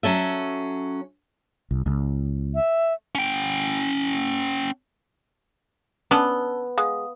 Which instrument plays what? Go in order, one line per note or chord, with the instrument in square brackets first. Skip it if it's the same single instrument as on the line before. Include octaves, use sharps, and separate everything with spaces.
[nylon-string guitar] F#3 C#4 A4 E5
[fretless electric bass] C2
C#2
[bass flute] E5
[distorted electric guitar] C#4 G5
[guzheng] B3 [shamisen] C#4 D4 [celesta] A5 E6 G7
[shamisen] G#3 [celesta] F5 F#5 D#6